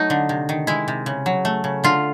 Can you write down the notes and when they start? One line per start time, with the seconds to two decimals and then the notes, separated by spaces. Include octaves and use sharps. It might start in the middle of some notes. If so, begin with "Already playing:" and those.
Already playing: F#3 A3 D#4
0.10 D3
0.29 C3
0.49 D#3
0.67 G#3 E4
0.88 C3
1.06 C#3
1.26 F#3
1.45 A3
1.64 C#3
1.84 D3 F4